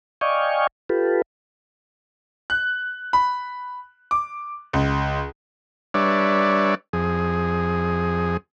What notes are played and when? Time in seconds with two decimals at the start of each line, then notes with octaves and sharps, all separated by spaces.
0.21 D5 D#5 F5 G5 G#5 C#6
0.89 F4 G4 A4 B4
2.50 F#6
3.13 B5
4.11 D6
4.73 C#2
5.94 G3 D4 B4 C#5 D5 E5
6.93 F2 G#4